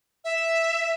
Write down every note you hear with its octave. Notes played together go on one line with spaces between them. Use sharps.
E5